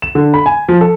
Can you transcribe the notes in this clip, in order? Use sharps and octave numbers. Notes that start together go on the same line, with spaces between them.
E7
D3
B5
G#5
F3
A4